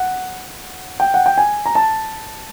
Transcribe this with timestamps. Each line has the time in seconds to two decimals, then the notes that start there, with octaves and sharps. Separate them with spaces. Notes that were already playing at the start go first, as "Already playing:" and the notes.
Already playing: F#5
1.00 G5
1.14 F#5
1.26 G5
1.38 G#5
1.66 A#5
1.75 A5